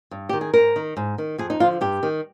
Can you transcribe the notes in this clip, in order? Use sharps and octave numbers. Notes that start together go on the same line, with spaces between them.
G2
D#3 G4
G#4
G#2 A#4
D#3
G#2
D#3
F2 G#4
D#4
D3 F3 F4
G2 G4
D#3